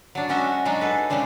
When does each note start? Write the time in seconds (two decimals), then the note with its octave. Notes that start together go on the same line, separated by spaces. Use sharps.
0.15 F#3 D4
0.29 F#3 G#3 C#4 F#4 D#5 E5
0.65 F#3 G#3 D4 D#4
0.81 G#4 A4 B4
1.10 C#3 G3 G#3 D4 C5